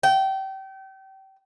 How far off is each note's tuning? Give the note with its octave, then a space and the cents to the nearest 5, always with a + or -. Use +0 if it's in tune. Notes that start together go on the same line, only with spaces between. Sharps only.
G5 -30